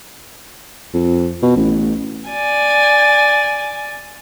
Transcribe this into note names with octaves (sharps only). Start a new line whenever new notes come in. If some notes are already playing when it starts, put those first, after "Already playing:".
F2
B2
A1
D5 G#5